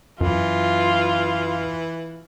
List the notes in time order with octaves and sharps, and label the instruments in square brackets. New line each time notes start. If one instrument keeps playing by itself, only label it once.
[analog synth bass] F#2 [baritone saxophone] E3 [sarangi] F4